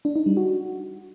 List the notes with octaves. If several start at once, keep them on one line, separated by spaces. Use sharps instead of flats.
D4
D#4
G3
F#4